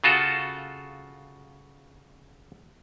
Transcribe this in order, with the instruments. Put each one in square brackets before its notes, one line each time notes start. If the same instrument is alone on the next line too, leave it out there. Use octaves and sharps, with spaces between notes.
[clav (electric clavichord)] C#3 F4 F#4 A4